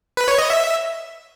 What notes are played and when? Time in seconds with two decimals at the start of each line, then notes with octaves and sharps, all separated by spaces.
0.17 B4
0.28 C#5
0.38 D#5
0.50 E5